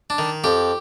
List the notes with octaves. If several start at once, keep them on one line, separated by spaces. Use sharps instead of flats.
D4
D#3
F2 G4